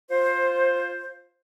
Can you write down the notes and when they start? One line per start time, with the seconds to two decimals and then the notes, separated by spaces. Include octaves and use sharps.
0.11 F4 C5